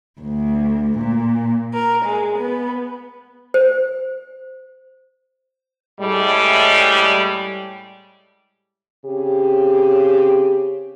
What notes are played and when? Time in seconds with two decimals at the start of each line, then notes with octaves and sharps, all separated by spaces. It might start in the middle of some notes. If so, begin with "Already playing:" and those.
0.20 D2
0.98 A#2
1.73 A#4
2.04 G#3
2.37 B3
3.54 C5
6.00 A2 G3 G#3
9.05 C#3 C4 G4